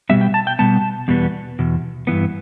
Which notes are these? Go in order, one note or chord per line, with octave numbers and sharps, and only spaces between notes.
B2 G3 B3 E5
G5
A5
G5
B2 G3 B3 A5
E2 B2 G3 B3
E2 B2
G2 E3 B3